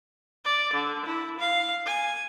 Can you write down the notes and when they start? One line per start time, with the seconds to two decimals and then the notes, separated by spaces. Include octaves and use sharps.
0.45 D5
0.73 D3
1.06 E4
1.40 F5
1.86 G#5